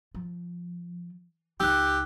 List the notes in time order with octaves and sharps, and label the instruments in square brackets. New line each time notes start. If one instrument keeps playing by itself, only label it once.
[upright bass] F3
[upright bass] C#2 D#4 [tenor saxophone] G4 [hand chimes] E6 F#6